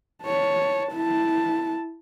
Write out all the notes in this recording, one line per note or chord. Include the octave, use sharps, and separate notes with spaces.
C#5 A5
E4 A5